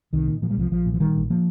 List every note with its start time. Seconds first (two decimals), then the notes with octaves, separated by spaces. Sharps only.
0.13 C2 D#3
0.27 A#2
0.42 A#2 F3
0.51 G3
0.57 C2 F3
0.71 A#1 F3
0.86 A#2
0.94 F3
1.00 A#2 D#3 G3
1.16 A#1
1.30 F3 A#3